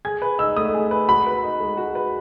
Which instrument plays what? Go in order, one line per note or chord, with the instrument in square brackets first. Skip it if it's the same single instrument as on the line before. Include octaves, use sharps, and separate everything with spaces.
[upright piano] G#4 [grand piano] G#6
[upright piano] B4
[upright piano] D#4 [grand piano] E6
[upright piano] A3 [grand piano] D#6
[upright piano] G#4
B4
[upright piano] F#4 [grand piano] B5
[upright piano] B4
D#4
G#3
F#4
B4